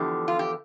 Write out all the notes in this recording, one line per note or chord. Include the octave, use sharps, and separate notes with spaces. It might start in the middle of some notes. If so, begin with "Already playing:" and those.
Already playing: E2 D3 F3 G4
F4
G4